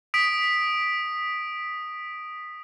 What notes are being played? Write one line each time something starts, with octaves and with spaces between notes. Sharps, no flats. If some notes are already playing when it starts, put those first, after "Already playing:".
D#6 B6 D7